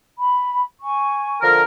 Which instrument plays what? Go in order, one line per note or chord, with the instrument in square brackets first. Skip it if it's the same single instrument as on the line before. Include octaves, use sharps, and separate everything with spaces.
[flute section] B5
G#5 C#6
[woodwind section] D3 F3 A#4